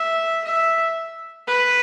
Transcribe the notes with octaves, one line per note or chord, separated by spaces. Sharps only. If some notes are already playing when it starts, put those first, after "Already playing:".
Already playing: E5
E5
B4